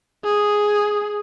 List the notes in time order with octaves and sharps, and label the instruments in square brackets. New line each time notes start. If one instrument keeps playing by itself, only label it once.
[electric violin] G#4